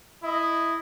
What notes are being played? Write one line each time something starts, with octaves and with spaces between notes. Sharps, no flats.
E4 D#5